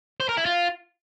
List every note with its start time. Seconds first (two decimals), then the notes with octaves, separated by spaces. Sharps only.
0.20 C5
0.29 A#4
0.37 E4
0.46 F4